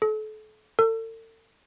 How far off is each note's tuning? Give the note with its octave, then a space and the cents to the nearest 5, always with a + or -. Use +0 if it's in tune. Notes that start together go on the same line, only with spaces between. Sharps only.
A4 -35
A4 +40